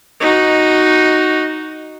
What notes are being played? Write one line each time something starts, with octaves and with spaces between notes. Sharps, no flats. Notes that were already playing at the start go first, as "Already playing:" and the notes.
D#4 F#4